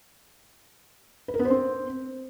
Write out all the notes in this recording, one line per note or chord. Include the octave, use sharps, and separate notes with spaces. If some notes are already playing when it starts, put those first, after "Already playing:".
B4
A#4
B3
C5
C4